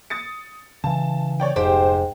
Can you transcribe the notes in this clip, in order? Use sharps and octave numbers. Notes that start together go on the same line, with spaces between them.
D#6 A6 C#7
C#3 E3 A5
C#5 D5 G5
F1 G#2 G4 C5